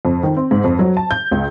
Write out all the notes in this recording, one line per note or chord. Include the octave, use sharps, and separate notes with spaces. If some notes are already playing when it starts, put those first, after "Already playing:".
F2
D#3
C4
G#2
F2
F#3
A5
G6
C#2